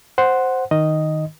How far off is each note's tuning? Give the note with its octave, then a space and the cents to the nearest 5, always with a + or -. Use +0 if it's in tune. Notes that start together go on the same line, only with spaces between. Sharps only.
C5 +0 F#5 +0
D#3 +0 D#5 +0